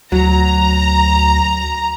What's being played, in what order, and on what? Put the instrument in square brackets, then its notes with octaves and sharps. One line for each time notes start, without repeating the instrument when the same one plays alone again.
[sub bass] D2 [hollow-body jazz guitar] F#3 [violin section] A#5